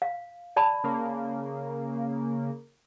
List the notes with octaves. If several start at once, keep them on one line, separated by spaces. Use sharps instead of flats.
F5
D5 A5 B5
C#3 A#3